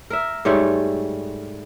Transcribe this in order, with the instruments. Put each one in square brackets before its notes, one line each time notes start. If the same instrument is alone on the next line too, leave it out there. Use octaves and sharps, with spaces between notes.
[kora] A#4 E5
G#2 G3 A3 C#5